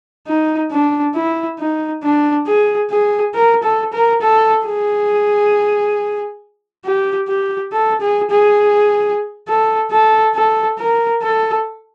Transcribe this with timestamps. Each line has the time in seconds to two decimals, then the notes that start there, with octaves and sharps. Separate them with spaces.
0.27 D#4
0.71 D4
1.15 E4
1.59 D#4
2.03 D4
2.46 G#4
2.90 G#4
3.34 A#4
3.63 A4
3.93 A#4
4.22 A4
4.66 G#4
6.84 G4
7.28 G4
7.72 A4
8.01 G#4
8.31 G#4
9.47 A4
9.91 A4
10.35 A4
10.78 A#4
11.23 A4